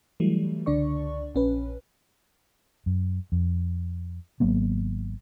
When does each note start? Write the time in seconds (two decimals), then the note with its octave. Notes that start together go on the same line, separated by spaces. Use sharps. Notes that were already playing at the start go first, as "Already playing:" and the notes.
0.20 E3 F#3 G3 A3
0.66 C#2 D3 D4 D5 C#6
1.35 A#1 C#4 B4
2.86 F#2
3.32 F2
4.40 G#1 F#3 A#3 B3